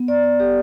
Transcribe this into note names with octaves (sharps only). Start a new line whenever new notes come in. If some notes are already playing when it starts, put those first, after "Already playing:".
Already playing: B3
D5
D5
G4